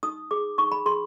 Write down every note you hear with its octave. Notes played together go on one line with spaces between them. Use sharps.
D#4 D#6
G#4 D6
D#4 C#6
B5
G#4 C6